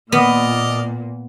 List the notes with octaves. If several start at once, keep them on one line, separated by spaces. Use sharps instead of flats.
A#2 B3 D5 D#5 F6